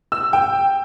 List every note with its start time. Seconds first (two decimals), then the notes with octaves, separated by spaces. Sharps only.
0.12 E6
0.33 G5